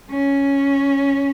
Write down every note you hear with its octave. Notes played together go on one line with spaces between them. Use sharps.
C#4